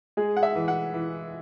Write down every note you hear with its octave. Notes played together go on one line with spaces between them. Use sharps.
G#3 G#4
F#5
E5
E3
F#5
E3